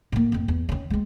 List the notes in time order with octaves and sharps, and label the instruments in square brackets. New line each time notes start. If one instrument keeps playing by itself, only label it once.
[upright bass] A2 A#3
F2 D#3
E2
D#3 C#4
G#3 C4